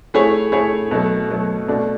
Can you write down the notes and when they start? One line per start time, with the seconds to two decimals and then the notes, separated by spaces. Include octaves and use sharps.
0.14 A3 E4 G#4 C#5
0.52 A3 E4 G#4 C#5
0.91 B2 F#3 A3
1.29 B2 F#3 A3
1.68 B2 A3 D4